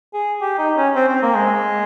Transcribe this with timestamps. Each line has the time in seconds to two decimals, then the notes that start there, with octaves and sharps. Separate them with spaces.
0.14 G#4
0.42 G4
0.58 D#4
0.76 C#4
0.96 C4
1.09 C4
1.22 A#3
1.35 G#3